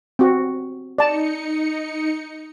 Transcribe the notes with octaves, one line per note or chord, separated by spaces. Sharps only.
C4 F#4
D#4 D5 A5 C#7